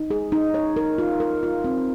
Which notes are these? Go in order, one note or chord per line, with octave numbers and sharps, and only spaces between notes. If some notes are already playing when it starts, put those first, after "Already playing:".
Already playing: D#4
G#4
D#4
C#5
A#4
F4
A#4
F4
C4